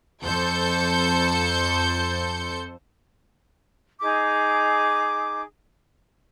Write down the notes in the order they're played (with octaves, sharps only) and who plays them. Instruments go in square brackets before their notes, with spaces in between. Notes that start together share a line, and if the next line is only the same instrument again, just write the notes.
[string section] F2 A4 C5 G6 C#7
[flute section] D#4 G#4 D6